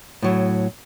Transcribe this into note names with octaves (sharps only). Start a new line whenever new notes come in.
A2 F#3